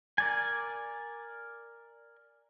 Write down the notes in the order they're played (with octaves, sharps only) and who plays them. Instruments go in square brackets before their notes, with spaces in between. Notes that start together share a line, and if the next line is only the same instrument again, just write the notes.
[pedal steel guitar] A#4 D5 G#5